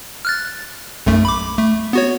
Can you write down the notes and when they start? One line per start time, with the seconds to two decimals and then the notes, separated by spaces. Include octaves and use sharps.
0.25 F6 F#6 A6
1.07 B1 F#2 A3
1.25 B5 D6
1.58 A3
1.93 B3 F#4 C#5